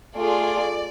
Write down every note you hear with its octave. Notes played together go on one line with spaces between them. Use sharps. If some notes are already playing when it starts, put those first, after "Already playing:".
A3 F4 G#4 D5